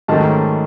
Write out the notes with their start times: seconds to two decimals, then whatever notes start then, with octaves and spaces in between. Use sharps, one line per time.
0.08 G#2 D#3 F#3 A3 C#4 A5